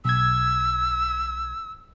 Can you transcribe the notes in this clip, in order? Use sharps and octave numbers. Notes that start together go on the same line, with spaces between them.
B1 E6 G#6